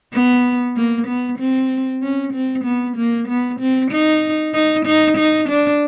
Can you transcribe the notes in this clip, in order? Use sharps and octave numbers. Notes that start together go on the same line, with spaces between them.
B3
A#3
B3
C4
C#4
C4
B3
A#3
B3
C4
D#4
D#4
D#4
D#4
D4